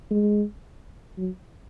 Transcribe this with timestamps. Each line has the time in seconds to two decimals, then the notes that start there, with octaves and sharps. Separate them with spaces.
0.11 G#3
1.18 F#3